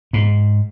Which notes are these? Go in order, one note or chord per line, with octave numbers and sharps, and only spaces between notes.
G#2